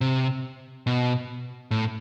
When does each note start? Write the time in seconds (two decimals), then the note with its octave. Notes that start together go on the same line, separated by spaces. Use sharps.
0.01 C3
0.87 B2
1.71 A2